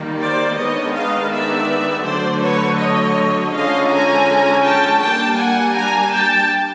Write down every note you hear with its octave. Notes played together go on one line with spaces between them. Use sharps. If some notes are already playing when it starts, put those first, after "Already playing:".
Already playing: D#3 G3 A#3
C5 D5
D#3 G#3 B3 D4 C#5 D#5
D#5 F5
D5 E5
D3 F#3 A3 C5 D5
B4 C#5
C#5 D#5
D3 F3 G#3 C#4 D#5 F5
G#5 A#5
G5 A5
G3 A#3 D4 G5 A5
F#5 G#5
G#5 A#5
G5 A5